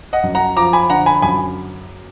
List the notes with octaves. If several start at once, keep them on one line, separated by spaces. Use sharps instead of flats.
D#5 F#5
F#2
F#5 A#5
F3 A#5 D6
G#5 B5
D3 F#5 A#5
G#5 B5
F#2 G#5 B5